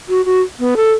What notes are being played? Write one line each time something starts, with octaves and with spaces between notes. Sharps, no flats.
F#4
F#4
B3
A4